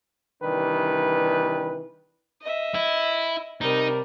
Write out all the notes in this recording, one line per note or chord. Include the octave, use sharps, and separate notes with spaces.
C3 D#3 E3 G3 D4 B4
D#5 E5
E4
C3 G3 D#4 A#4